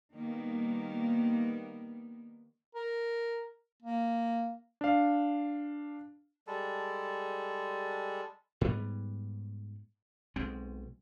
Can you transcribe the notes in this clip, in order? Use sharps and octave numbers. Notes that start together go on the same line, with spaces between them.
D#3 G3 A#3 B3
A#4
A#3
D4 F5
G3 G#3 A4
G#2 G3 B3
B1 B2 G#3 C4